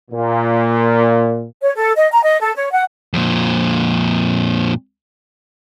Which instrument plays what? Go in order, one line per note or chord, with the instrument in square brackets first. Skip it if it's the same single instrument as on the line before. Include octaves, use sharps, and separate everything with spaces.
[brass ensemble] A#2
[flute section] C#5
A4
D#5
A#5
D#5
A4
C#5
F#5
[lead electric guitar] F2 A#2